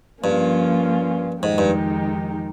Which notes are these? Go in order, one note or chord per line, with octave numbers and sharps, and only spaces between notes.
G2 F3 A#3 C#4 F4
F2 G#2 D#3 G#3 D#4 G4
G2